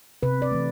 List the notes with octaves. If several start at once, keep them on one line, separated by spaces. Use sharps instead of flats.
C3 B4
D5
E3 A3